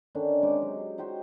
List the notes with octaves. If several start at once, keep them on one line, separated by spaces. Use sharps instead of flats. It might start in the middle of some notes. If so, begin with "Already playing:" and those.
D3 D#3 C#4 D4
C3 G#3 D#4 D6
F#3
G#4
D#4 F#4 G4 C5